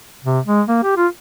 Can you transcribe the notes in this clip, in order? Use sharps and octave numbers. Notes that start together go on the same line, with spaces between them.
C3
G#3
A#3
G4
F4